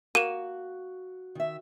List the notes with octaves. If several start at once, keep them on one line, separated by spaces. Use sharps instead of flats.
A#3 F#4 D#7 E7
D#3 E5